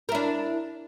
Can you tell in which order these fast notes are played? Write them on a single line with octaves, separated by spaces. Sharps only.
A#4 E4 D4